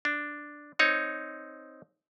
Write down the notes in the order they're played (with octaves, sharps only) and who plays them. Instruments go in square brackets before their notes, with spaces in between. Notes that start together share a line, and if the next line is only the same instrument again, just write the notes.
[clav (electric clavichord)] D4
C4 D#4 C#5